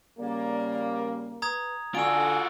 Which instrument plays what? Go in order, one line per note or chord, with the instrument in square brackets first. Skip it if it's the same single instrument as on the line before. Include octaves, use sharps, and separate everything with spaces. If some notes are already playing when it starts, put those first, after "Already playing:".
[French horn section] C#3 G3 A#3 [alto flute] D5
[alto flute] B4 [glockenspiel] A#5 D#6 G#6
[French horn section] D3 [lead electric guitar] F4 F#4 [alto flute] G#5 [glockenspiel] E6 D7